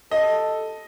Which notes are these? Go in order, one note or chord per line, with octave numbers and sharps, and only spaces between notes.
A4 D#5